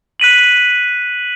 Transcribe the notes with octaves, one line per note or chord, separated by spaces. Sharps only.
F#6 B6 D#7 F#7